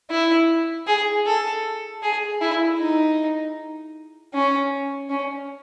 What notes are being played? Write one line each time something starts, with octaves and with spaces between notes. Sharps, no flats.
E4
G#4
A4
G#4
E4
D#4
C#4
C#4